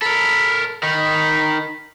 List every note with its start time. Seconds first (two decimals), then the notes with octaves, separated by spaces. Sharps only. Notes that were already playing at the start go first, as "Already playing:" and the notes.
0.02 A4 A#4 B5
0.83 D#3 D#4 B5